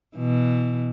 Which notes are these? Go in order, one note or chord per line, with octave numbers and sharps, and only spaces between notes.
B2 E3